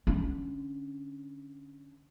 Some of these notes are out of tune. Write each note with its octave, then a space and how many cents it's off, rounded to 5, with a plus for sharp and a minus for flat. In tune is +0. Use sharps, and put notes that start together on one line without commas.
D3 +0 C#4 +0